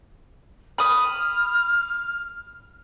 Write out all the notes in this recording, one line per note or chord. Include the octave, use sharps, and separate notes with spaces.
B5 D#6 F6